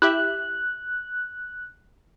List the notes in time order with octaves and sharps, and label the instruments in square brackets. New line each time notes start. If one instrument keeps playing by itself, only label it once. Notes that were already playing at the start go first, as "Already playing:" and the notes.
[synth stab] E4 G4 E5 [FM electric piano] F#6